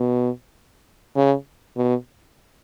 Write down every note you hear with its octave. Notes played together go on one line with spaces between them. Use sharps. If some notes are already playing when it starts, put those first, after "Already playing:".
Already playing: B2
C#3
B2